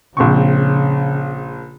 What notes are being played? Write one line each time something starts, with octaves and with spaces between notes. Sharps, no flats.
A#1 C#3 C4 C#6